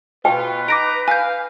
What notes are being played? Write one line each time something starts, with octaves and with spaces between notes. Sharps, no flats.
B2 F4 B4 G5
D#4 A#5 D6 A#6 D7
F5 G#5 G6